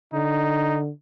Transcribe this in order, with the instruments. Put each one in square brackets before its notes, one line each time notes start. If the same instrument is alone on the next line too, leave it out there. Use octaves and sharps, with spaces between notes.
[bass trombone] D3 [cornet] D#4